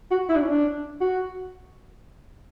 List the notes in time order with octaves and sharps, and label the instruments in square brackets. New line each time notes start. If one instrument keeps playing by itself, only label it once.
[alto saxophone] F#4
E4
D4
C#4
D4
F#4